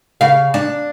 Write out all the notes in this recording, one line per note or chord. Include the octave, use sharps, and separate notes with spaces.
C#3 F5
D4